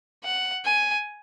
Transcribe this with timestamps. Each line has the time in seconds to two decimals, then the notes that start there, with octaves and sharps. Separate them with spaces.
0.24 F#5
0.65 G#5